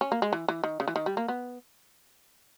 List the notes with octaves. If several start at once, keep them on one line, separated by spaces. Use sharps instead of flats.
C#4
A#3
G#3
E3
E3
D#3
C#3
E3
D#3
G3
A#3
B3